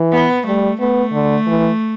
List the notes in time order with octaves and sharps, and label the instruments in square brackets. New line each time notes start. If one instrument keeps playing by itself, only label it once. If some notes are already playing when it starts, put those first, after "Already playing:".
Already playing: [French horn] E3
[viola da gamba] B3
[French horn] G3 [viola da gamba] A3
[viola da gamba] A3 [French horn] B3
[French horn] D3
E3